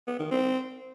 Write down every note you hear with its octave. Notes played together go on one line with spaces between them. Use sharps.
B3
D#3
C4